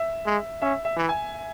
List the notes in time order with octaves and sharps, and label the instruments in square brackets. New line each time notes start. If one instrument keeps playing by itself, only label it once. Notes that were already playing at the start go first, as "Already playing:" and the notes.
Already playing: [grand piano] E5
[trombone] G#3
[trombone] C#4 [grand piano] E5
[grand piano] E5
[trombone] E3
[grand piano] G#5